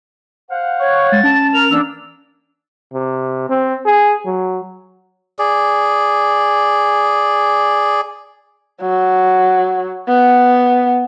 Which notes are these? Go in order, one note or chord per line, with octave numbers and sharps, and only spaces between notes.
C5 F5 F#5
C#5 C#6
G#3 A6
C#4 A5
A#4 F7
E3 A#3 D4 E6
C3
C4
G#4
F#3
G#4 D5
F#3
B3